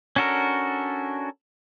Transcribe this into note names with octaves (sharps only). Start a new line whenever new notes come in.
C#4 D4 F#4 A4 A#4